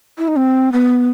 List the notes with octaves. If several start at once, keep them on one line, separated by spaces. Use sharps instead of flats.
E4
D#4
C4
B3